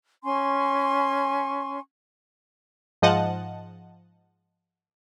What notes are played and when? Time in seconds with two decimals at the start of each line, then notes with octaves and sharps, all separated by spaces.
0.24 C#4 G#5 C6 C#6
3.02 G#2 F3 D#5 F#5 A5